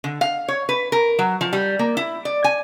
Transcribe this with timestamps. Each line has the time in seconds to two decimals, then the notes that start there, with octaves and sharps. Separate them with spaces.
0.04 D3
0.21 F5
0.48 C#5
0.69 B4
0.92 A#4
1.19 F#3
1.41 F3
1.53 G3
1.79 A#3
1.97 E4
2.25 D5
2.44 G#5